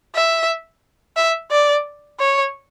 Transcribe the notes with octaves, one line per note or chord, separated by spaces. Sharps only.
E5
E5
D5
C#5